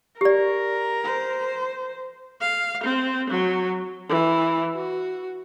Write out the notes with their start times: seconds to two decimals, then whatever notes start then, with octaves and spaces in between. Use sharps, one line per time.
0.21 G4 A#4 D5
1.04 C5
2.41 F5
2.84 C4
3.30 F#3
4.09 E3
4.74 F#4